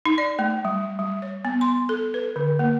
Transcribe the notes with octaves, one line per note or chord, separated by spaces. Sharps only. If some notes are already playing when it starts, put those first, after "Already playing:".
D#4
D5
A3
G3
G3
C#5
B3
C6
A4
B4
D3
A#3